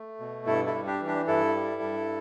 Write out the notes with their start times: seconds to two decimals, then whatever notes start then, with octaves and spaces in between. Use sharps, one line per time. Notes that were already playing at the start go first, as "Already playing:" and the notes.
Already playing: A3
0.20 B2
0.46 G2 E4 A4
0.67 E4 A4
0.74 G3
0.87 D4 G4
1.00 E3
1.07 D4 G4
1.28 G2 E4 A4
1.55 G3
1.82 G2